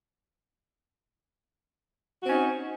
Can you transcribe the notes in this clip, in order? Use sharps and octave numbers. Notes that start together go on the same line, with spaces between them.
C4 C#4 D#4 F#4